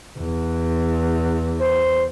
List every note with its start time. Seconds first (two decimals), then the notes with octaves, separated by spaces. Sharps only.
0.18 E2
1.60 C5